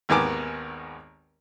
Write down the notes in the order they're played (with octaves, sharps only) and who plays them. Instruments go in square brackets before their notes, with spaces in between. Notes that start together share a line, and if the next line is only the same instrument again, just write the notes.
[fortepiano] G#1 D#2 D#3 B3 G#5 D6